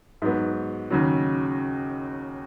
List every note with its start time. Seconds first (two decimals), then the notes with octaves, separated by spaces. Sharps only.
0.22 G#2 F#3 B3
0.90 D#2 C#3 F#3